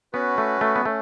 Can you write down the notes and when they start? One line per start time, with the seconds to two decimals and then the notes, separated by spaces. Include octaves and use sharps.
0.13 B3 C#4 F#4 B4
0.38 A3
0.61 A3
0.76 B3
0.85 A3 C#4